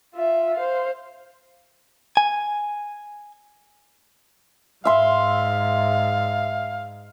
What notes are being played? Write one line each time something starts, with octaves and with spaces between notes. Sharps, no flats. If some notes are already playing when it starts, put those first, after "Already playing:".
F4 E5
C5 F5
G#5
G#2 E5 F5 C6